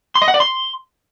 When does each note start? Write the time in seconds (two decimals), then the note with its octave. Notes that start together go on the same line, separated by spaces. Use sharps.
0.15 C6
0.22 D#5
0.28 F#5
0.34 D5
0.40 C6